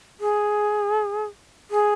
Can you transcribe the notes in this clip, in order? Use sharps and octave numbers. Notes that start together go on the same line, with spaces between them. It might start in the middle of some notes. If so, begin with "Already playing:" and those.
G#4
G#4